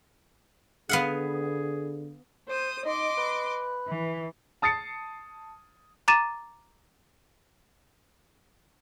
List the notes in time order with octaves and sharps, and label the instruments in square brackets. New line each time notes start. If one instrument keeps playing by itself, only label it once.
[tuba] D3 [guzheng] B3 F5 F#5 [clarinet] G#4
[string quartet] C5 D#6
[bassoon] D#4 [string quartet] D#5 C6 D6
[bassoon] B4
[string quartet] E3
[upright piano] A5 D#6 A6 C7 C#7
[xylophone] A#5 D6 A6 D#7 E7